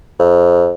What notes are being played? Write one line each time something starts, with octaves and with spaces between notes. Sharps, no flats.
F2